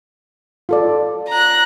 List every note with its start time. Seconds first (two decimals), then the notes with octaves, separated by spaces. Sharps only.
0.69 F4 A4 D5
1.29 A#5 F#6